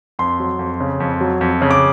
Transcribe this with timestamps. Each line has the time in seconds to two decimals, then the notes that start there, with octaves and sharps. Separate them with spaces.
0.19 F2 C6
0.40 F#3
0.59 F2
0.80 C#3
1.00 F2
1.21 F#3
1.41 F2
1.62 C#3
1.71 D6